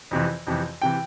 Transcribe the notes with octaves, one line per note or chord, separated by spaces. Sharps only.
F2 C3 E3
F2 C3 E3
C3 E3 G5